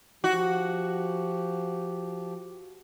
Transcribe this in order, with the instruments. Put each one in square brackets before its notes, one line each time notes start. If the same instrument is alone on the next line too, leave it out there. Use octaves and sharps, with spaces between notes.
[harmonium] F3 G4 [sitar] F#4